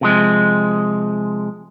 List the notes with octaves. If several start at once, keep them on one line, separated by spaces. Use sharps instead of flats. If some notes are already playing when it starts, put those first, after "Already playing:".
C3 F3 G#3